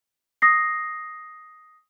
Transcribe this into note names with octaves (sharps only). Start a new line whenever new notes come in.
D#6 A#6 C7